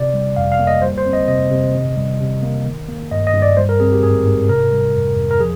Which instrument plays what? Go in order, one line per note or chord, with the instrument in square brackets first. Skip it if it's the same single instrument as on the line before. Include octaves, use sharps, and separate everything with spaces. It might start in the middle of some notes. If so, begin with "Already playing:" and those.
Already playing: [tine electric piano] C3 D5
G3
F2 F5
F5
A#3
D#5
G3 C5
C5
C4
D#5
C3 D#5
C3
D#3
G3
C3
A#3
D#3
A#3
G2 D#5
D#5
G2
D5
G3 C5
A#4
C4 G#4
G4
G#2 G#4
G#2
C3 A#4
G3
F2
F2
A#4
F3 G#4